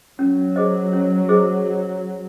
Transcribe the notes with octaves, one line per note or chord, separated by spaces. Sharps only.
F#3 C#4
G#4 C5 D#5
C#4
G#4 C5 D#5